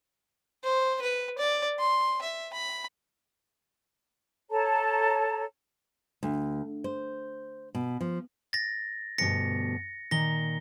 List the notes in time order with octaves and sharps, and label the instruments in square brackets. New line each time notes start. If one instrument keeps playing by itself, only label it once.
[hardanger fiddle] C5
B4
D5
C6
E5
B5
[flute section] A4 C#5 A5 A#5
[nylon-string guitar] D2
C5
B2
F3
[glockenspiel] A6 A#6
[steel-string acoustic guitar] D2 G2 B2 [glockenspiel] A#6 C#7
[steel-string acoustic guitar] A#2 D#3 A#5 [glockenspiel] A#6 G7